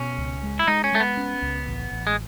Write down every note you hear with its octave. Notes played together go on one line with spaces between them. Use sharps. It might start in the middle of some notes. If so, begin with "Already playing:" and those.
Already playing: B2 C#4
C#2
G#3
E4
G#3 D#4
C#4
G#3 A3
B3
C#4
C#2
A1
A1
G#3